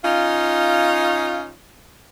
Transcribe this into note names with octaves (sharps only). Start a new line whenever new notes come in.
C#4 D#4 F4